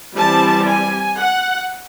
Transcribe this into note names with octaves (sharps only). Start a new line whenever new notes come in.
E3 G3 C4 A5
G#5
F#5